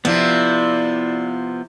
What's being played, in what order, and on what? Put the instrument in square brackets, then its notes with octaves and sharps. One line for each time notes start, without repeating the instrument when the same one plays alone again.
[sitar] C3 F3 [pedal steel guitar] B3 F4 [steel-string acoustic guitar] E4 [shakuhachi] D5